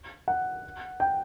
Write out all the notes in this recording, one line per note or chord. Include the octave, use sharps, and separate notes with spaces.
F#5
G5